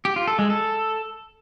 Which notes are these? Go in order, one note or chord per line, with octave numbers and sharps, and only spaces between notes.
G4
F4
A4
G#3
A4